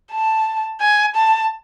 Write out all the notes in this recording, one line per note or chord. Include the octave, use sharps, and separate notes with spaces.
A5
G#5
A5